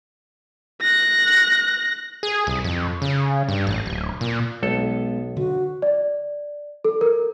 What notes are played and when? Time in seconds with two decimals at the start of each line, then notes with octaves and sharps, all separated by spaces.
0.81 F#6 A#6
2.23 G#4
2.47 C2
2.64 F2
3.02 C#3
3.48 G2
3.67 A1
3.86 D1
4.21 A#2
4.63 B1 G#3 B3 A4
5.36 D3 F#4
5.82 D5
6.84 A4
7.01 A#4